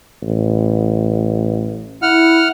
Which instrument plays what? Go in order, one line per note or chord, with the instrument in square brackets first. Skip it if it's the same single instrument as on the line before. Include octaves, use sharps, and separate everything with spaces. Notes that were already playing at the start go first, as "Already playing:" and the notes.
[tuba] A1
[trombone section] E4 [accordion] F#5 F6